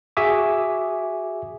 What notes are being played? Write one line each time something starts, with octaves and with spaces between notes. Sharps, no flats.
F#4 G#4 E5 G#5 D6 D#6